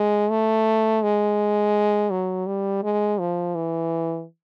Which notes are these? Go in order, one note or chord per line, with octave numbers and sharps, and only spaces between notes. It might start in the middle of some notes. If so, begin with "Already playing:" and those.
Already playing: G#3
A3
G#3
F#3
G3
G#3
F3
E3